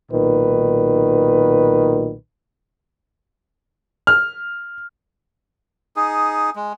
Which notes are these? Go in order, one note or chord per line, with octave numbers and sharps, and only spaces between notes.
B1 A#2 D#3 B4
F6
D#4 G#4
G#3